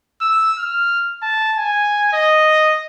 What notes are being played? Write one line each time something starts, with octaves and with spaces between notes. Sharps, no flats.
E6
F6
A5
G#5
D#5